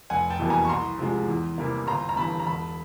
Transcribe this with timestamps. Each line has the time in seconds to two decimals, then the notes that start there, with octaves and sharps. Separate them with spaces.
0.10 F1 F#5 G#5
0.30 G5 A5
0.39 E2 B2 G3 A#3
0.50 G#5 A#5
0.65 C#6
0.69 C2 A#5 C6
0.98 C3 F3 G#3
1.28 E2
1.58 C3 E3 G3 A#3
1.87 G1 A#5 C6
2.09 A#5
2.16 G2 E3 A5 B5
2.40 A#5
2.45 E1 A5 B5